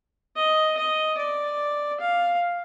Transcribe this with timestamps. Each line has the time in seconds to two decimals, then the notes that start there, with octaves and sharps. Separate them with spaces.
0.36 D#5
0.77 D#5
1.18 D5
2.00 F5